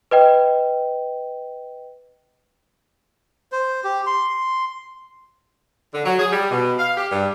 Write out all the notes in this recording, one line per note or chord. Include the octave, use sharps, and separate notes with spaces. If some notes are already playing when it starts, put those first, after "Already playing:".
B4 D#5 G5
C5
G4
C6
D3
F#3
G#4
G3
B2
F5
G4
G2